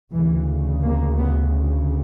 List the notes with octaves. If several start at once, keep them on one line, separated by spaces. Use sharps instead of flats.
D2 C#3 E3
A#3
B3